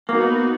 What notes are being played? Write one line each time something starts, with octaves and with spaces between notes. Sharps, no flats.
A#3 B3 D#4 F#4